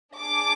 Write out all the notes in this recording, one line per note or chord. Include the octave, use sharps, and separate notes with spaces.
D4 G#4 D6